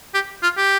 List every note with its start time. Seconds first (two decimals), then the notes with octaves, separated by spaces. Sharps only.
0.14 G4
0.43 F4
0.57 G4